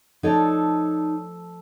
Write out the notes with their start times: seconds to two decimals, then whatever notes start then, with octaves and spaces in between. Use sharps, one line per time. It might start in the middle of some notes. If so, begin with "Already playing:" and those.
0.23 F3 D#4 A4 C#5 D5